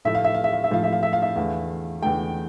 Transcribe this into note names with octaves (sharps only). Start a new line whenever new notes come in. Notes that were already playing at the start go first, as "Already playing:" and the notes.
A2 F3 A3 E5
F5
E5
F5
E5
F5
E5
A2 F3 A3 F5
E5
F5
E5
F5
E5
E2 D3 A3 F5
E2 D3 A3 G5